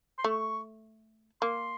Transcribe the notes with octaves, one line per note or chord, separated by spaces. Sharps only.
C6
A3 C#6
A#3 C6